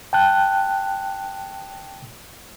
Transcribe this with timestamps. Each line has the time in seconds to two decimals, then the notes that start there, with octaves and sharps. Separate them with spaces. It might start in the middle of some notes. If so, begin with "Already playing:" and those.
0.13 G5 A5 F#6